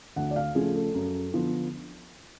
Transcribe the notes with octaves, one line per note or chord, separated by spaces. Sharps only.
D2 F#5
D5
F5
C#3 F3 A3 G#4
A4
F#2
D3 F3 B3